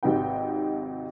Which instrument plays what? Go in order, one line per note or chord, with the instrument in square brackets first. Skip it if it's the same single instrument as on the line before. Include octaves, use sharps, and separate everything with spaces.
[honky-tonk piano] G#1 C3 D#4 B4 G5